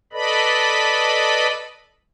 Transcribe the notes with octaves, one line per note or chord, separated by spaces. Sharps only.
A4 B4 D5 D#5 B5